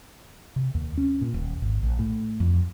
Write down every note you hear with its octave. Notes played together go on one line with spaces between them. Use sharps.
C3
D#2
C#4
A#2
D#1
G#1
A#1
A2
F2